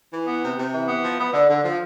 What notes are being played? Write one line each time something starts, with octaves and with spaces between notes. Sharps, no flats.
E3
B3
C3
C3
E3
B3
F3
B3
D3
D3
F3